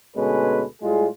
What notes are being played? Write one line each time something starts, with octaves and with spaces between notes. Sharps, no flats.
D2 B2 G#3 C#4 A4 B4
A2 G3 G#3 F4 G#4